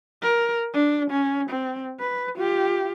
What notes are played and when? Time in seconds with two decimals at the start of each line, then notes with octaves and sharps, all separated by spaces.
0.23 A#4
0.74 D4
1.11 C#4
1.50 C4
2.00 B4
2.36 F4 G4